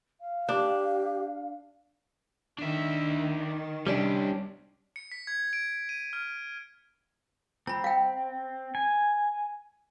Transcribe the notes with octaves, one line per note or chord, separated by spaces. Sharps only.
F5
D4 G4
D#3 D4 E5
C2 C3 G3 C#4 D4
C#7
B6
G#6
D7
D#7
F6
C4 A#5 B5
F5 G5
G#5